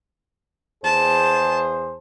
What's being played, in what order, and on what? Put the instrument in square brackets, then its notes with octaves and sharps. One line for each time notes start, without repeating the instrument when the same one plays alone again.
[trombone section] E2 G#4 C5 [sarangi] A5